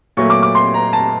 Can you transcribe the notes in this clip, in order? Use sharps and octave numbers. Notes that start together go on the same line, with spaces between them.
A#2 F#3 A3 C#6
D6
D6
C6
A#5
A5